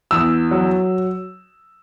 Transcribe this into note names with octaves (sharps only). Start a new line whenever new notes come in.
E2 E6
F#3